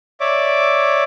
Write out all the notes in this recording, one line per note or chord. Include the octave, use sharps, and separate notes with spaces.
C#5 D5 E5 D6